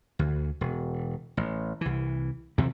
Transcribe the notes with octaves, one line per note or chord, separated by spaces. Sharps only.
D2
E1
A1
C2 E3
F2 C3 E3 F3